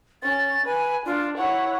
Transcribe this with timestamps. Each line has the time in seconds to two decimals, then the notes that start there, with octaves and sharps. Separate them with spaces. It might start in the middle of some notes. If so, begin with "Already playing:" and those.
0.22 C#4 A6
0.66 B4 G#5
1.06 D4 F4
1.37 E4 C#5 F#5